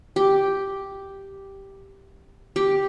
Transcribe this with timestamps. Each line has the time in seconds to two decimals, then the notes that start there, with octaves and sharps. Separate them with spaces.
0.16 G4
2.56 G4